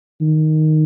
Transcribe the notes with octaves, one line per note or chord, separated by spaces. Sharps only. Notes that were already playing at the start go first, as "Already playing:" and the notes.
D#3